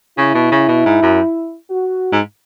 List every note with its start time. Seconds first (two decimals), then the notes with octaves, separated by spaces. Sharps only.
0.18 C#3 E4
0.35 B2
0.52 C#3
0.69 B2
0.86 G#2
1.02 F#2
1.70 F#4
2.12 G#2